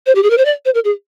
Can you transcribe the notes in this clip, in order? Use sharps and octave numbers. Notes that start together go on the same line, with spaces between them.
C5
G4
G#4
A#4
C5
D5
C5
A#4
G#4